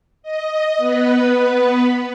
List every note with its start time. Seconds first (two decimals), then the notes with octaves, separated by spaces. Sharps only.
0.23 D#5
0.78 B3 B4